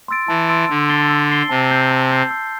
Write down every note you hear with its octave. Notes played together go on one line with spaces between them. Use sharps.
C6 E6 A6 D7
E3 A5
C6 E6 A6 D7
D3 E6
A6 C7 G7
E6
A6 C7 G7
C3 A5
E6 G6 C7
A5
E6 G6 C7
E6